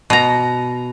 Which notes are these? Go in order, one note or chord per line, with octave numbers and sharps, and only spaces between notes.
B2 A#5